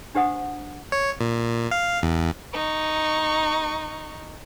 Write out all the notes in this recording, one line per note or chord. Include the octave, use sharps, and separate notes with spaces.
D4 G4 C5 F#5 D#6
C#5
A#2
F5
E2
D#4 C#6